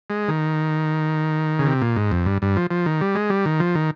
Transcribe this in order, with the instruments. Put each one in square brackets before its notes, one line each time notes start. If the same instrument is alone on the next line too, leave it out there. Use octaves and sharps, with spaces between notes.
[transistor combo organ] G#3
D#3
C#3
C3
A#2
G#2
F2
G2
G2
F3
F3
D#3
G3
G#3
G3
D#3
F3
D#3